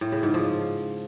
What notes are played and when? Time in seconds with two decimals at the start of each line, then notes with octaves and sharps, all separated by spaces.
0.01 A2
0.12 C#3
0.23 G#2
0.34 F3